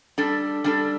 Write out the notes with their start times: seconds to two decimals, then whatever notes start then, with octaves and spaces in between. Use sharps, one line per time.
0.18 G3 D4 A4
0.64 G3 D4 A4